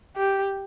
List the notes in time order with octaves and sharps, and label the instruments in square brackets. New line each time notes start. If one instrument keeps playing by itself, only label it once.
[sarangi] G4